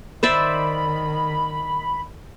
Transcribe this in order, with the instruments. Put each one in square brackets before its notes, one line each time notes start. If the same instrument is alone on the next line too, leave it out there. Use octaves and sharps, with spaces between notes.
[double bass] D#3 [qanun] C5 D5 E5 [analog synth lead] B5